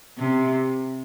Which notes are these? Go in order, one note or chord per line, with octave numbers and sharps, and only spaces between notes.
C3